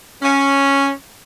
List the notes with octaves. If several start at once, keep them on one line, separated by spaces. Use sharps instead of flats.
C#4